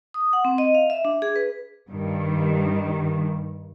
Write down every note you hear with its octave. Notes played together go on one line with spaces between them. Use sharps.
D#6
F#5
C4
D#5
F5
E5
D4
G#4
B4
G2 D#3